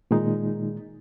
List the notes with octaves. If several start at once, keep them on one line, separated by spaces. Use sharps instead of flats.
A#2 D#3 G#3 D#4